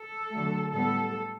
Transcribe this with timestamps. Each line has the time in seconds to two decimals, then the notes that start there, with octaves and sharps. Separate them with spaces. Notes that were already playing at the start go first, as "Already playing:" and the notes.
Already playing: A4
0.31 D3 F#3 A3
0.73 A2 G3 B3 A4